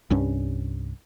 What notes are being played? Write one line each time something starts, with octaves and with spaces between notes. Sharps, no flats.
C2 G2 C#4